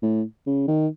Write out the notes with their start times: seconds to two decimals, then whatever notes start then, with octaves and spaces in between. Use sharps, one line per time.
0.02 A2
0.46 C#3
0.68 D#3